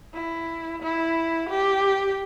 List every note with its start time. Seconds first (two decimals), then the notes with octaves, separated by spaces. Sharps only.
0.14 E4
0.82 E4
1.50 G4